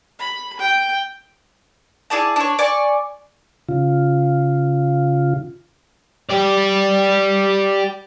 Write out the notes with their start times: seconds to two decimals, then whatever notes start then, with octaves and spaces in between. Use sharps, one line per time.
0.19 B5
0.59 G5
2.10 E4 G#4 D5 A5
2.36 D4 C#5
2.59 D5 G#5 C#6
3.68 C#3 F4
6.29 G4 D5